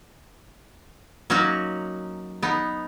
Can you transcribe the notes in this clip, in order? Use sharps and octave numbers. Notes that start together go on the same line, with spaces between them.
F#3 A#3 C#4 D#4 F#4
B3 D#4